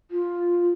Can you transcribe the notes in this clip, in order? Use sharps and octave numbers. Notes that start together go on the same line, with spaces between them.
F4